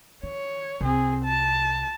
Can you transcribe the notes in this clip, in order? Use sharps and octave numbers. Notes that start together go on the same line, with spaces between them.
D#3 C#5
C2 C4 G#4
A5